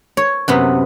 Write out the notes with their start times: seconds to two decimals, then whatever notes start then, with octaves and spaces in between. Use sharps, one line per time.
0.17 C#5
0.48 F#2 C3 B3